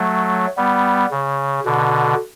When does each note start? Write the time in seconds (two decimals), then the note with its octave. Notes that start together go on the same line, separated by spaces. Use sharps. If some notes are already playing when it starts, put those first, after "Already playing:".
Already playing: F#3 A3
0.57 G3 B3
1.11 C#3
1.65 B2 D3